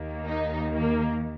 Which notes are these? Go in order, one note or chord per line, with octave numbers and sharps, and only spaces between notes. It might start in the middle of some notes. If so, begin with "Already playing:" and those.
Already playing: D#2 D#3 A#3
D#4
A#3